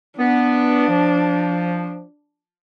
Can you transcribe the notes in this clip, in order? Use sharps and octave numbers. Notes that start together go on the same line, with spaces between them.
B3 D4
F3